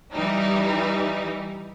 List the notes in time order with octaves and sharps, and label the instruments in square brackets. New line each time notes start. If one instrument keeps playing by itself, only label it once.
[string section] E3 G3 D#4